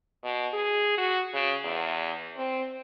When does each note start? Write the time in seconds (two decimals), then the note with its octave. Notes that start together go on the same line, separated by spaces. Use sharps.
0.23 B2
0.53 G#4
0.97 F#4
1.33 C#3
1.64 E2
2.37 C4